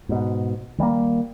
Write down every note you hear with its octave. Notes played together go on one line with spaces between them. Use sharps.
G#2 B2
D#3 G3 G#3 A#3